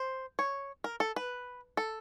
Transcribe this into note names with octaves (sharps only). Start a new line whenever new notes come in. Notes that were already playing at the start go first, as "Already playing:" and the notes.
Already playing: C5
C#5
A#4
A4
B4
A4